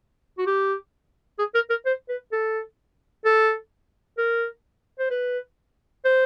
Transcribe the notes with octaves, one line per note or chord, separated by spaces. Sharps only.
F#4
G4
G#4
A#4
A#4
C5
B4
A4
A4
A#4
C5
B4
C5